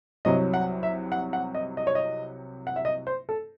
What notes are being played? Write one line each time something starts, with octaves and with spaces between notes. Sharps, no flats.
C2 C3 F#3 D#5
F#5
E5
F#5
F#5
D#5
D#5
C#5
D#5
F#5
E5
D#5
C5
A4